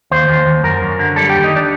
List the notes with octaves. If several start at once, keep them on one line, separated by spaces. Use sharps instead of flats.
D#2 C5
D#2
D#2
F#2 A#4
F#2
D3
G3 A4
G4
D#2
D#4
D4